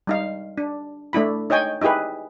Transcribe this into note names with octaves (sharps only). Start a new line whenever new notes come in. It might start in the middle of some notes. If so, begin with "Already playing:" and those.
G3 D#4 F5
D4
A3 D4 E4 B5
D#4 C#5 D#5 G5 G#5
D#4 E4 G4 G#4 B4